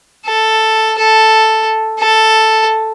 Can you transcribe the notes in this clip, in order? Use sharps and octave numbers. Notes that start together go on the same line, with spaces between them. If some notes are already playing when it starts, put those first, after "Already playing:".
A4
A4
A4